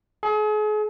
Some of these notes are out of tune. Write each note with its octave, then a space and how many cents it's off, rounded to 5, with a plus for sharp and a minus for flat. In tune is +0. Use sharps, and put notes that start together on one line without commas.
G#4 +40